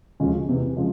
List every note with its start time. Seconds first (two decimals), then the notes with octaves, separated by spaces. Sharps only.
0.20 D2 C#3 F3 G#3 C#4
0.48 E2 C3 E3
0.77 C#3 F3 G#3